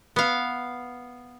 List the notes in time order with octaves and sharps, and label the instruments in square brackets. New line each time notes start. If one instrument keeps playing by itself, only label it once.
[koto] B3 F5